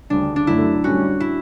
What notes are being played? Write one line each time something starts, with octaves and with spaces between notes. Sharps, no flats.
D2 C#3 G3 D4
D4
F#2 D3 F#3 A3 E4
A2 G3 C#4 F#4
E4